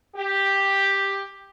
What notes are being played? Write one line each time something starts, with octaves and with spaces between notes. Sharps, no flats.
G4